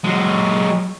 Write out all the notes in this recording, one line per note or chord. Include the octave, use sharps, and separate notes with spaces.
F#3 G#3